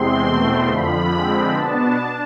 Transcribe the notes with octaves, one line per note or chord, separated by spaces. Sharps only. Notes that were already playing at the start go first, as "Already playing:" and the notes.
Already playing: E2 C3 G#3 C4 C6
E2 B2 A3 C4
F2 D3 F3 B5
D3 F3 G#3 C4
B2 B3 D4 A5
D4